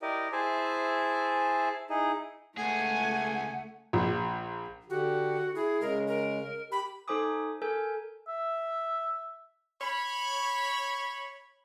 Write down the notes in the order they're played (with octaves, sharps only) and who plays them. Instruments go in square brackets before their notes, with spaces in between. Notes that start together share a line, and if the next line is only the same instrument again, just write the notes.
[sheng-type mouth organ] E4 G4 A#4 D5 D#5
E4 G#4 C5 E5 G#5 A5
D#4 E4 G#4 D#5
[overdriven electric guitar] C#2 G#4 [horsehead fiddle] A3 [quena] F#5 [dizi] G#5
[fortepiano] A#1
[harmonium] D3 G4 [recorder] F#4
[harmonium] E4 [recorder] G#4
[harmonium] C#3 G#3 [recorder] A#4
[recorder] A#4
[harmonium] G4 [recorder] B5
[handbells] D#4 A4 C5 G#5 D6 D#6
A4 A#4 G#5 G6
[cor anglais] E5
[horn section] C#5 B5